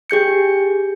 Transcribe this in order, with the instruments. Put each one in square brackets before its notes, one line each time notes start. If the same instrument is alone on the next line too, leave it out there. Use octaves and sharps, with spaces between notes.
[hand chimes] G4 G#4 G6 C#7